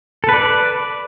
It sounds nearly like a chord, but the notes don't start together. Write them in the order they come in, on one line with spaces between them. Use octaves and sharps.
A4 B4 D5